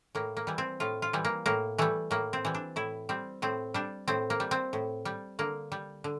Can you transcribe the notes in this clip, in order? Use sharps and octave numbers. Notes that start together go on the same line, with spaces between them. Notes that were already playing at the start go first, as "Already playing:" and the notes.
A2 A#3
A#3
E3 G3
C4
A2 F4
F4
E3 G3
A#3
A2 A#3
E3 G3 A3
A2 A#3
C4
E3 G3
D4
A2 E4
G3 C4
A2 C4
G3 D4
A2 C4
A#3
G3
C4
A2
G3
D3 A#3
G3
D3